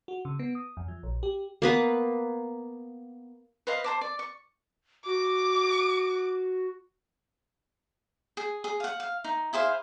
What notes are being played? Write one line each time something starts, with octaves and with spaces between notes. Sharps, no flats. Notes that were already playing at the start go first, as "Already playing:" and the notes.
F#4
C#3
B3
D#6
F2
F3
A#1
G4
A#3 B3 B4
B4 C5 D#5 F5
C5 A5 D6
D5
C#6
F#4 D6
G#4
G#4
F5 F#5
F5
D#4
E4 G#4 C5 F5